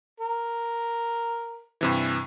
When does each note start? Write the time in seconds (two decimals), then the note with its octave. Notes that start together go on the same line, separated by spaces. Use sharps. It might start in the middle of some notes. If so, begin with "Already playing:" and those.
0.20 A#4
1.81 G2 C3 E3